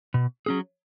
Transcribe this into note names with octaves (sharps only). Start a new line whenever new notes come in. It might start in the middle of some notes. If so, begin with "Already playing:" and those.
B2
F#3 C#4 G#4